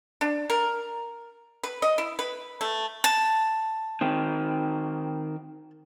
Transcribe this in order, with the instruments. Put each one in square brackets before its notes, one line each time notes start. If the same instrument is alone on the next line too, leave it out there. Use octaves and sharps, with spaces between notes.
[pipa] D4
A#4
B4
D#5
E4
B4
A3
[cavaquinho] A5
[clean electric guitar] D#3 C4